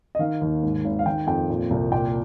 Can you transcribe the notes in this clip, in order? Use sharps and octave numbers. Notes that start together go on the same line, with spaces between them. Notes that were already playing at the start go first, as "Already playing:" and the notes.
D#5
D#3 F5
D#2
G#2
G#1
F5
D#3 G5
F2 G5
A#2
C2
A#2 G5